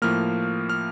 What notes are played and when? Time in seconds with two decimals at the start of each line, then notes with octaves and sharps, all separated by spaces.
0.02 A2 F3 A#3 F6
0.69 F6